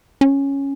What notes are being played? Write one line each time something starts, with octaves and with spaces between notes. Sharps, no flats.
C#4